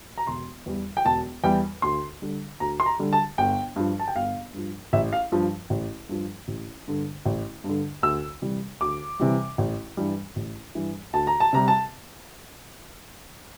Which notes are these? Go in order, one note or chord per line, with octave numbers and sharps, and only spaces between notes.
A#5
E1 C6
E2 E3 G3
G5
E1 A5
E2 E3 G3 G5
D2 C6
D3 G3
D2 A#5
C6
A#5
D3 G3
A5
G1 G5
G2 F3
A5
G5
G1 F5
G2 F3
A1 E5
F5
G2 F3
A1
G2 F3
A1
G2 D3
A1
G2
D3
D2 E6
C3 E3 G3
D2 D6
C3 E3 G3
A1
G2 E3 G3
A1
G2 E3 G3
D2 A5
A#5
A5
C3 G3 A#5
A5